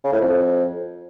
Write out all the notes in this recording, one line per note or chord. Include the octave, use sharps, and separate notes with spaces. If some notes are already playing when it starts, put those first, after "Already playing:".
C#3
A2
F2